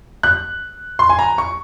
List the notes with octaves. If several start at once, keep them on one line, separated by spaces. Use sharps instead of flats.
F#6
C6
G#5
A#5
C#6